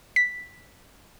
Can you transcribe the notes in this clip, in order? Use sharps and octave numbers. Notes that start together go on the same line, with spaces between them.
B6